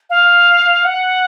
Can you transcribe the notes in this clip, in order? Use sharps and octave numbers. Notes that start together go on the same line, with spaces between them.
F5
F#5